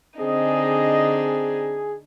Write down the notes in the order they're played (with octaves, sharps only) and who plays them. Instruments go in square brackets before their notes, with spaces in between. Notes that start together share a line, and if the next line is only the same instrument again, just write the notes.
[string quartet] D3 D4 D#4 [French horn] C4 [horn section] G#4 [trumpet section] D#5